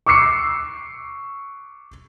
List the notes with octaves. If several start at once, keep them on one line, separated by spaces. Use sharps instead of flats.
C#6 D6 E6 F#6 C7 C#7